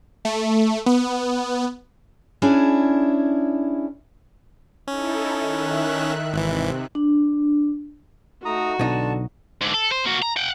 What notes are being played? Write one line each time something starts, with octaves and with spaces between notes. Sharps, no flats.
A3
B3
C#4 D4 E4 G#4
C#4 D#4 E4 A4
D#3 E5 F#6
G#1 C3 E3
D4
A3 D#4 F#4 A#5 D#6
B1 D3 D#4 A5
G#2 D3
A4
C5
A#3 F#4
A#5
F#5 G5